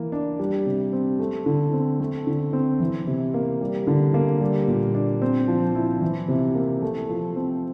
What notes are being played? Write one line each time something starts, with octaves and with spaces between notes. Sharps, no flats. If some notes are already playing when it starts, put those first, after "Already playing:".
Already playing: E3 A#3
D4
G3
C3
C4
A3
D3
C4
A3
D3
C4
E3
C3
A#3
G3
D3
A#3
G3
A#2
D4
C4
F3
E4
E3
C3
A#3
A3
F3
C4